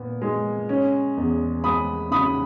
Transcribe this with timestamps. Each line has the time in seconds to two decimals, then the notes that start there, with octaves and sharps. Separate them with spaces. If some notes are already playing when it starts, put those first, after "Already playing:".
Already playing: A#2 B3
0.22 G#3
0.69 C#4
1.17 E2
1.64 G#3 B5 D#6
2.11 C#3 B5 D#6